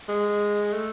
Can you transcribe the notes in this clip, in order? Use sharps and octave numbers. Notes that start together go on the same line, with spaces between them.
G#3
A3